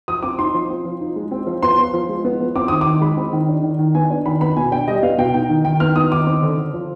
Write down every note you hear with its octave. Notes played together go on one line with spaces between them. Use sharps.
F3 D#6
C4 D6
D#4 C6
F3
C4
F3
D#4
G#3
C4
F3
B3 C6
F3
F3
G#3
B3
F3
C4 D6
D#3 D#6
D6
D#3
G#3 B5
C4
D#3
D4
D#3
D#3
B3 G#5
D4
D#3 B5
B3 B5
B2 G#5
D4 G5
G3 D#5
B3 F5
B2 G5
D#4 G5
D#3
D#3 G5
B3 F6
D#4 D#6
D#3 D6
C4
D3
D3
F3